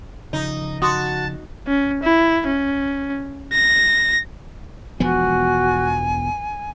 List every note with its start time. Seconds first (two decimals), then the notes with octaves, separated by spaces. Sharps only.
0.33 C#3 F3 D#4
0.82 F#4 A5 C6 D#6
1.67 C#4
2.03 E4
2.47 C#4
3.53 A#6
5.00 E1 F3 B3 F#4 G#5